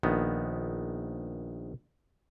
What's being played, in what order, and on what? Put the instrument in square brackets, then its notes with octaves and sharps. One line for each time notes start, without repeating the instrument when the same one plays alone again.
[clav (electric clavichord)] A#1 D#3 B3